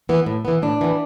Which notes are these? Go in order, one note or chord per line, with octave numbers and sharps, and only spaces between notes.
E3 B3
A2
E3 B3
A2 D4
E3 B3